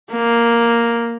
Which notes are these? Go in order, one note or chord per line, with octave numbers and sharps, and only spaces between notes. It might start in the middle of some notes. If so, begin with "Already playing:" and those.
A#3